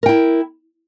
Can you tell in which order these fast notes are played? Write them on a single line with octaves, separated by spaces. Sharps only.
A#4 G5 E4